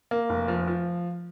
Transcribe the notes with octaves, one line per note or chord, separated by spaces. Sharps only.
A#3
F1
F3
F3